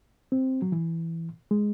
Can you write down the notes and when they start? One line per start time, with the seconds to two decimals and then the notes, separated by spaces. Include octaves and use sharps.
0.32 C4
0.62 F#3
0.72 E3
1.51 G#3